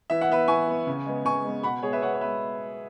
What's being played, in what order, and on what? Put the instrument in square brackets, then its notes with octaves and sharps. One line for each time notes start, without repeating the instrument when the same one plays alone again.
[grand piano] E3 E5
F#5
B3 B4 E5
E3 G#5 C#6
B3
C#3
G#3 B3
C#3 G#5 C#6
G#3 B3
B2 F#5 B5
G#3 B3 G#4 C#5
B4 E5
B2 C#5 F#5
C#5
G#3 B3 B4 E5